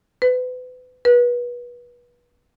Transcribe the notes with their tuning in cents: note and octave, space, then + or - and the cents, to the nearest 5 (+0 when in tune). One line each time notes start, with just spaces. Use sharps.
B4 +35
B4 -30